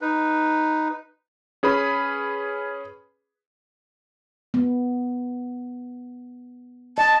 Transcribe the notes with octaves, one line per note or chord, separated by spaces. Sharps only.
D#4 B4
C#4 G#4 B4 B5
B3
D#5 A5